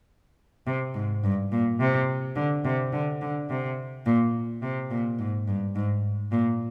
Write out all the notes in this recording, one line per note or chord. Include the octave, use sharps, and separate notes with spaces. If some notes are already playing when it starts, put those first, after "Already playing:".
C3
G#2
G2
A#2
C3
D3
C3
D3
D3
C3
A#2
C3
A#2
G#2
G2
G#2
A#2